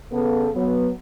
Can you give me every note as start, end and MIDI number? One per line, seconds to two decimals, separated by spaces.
0.12 0.49 49
0.12 0.49 59
0.12 0.49 69
0.54 0.90 54
0.54 0.90 59